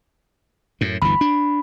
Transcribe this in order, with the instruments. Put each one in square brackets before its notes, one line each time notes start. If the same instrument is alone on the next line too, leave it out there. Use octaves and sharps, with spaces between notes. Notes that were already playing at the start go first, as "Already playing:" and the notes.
[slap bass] F#2 A2
[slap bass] G1 D2 E3 [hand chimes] B5
[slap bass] D4